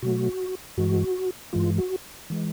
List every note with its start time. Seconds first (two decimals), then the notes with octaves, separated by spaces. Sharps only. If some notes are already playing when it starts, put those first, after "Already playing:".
0.02 B2 F#3 A3 F#4
0.77 G2 E3 G#3 F#4
1.53 G2 E3 G#3 F4
1.78 F#4
2.30 E3 G#3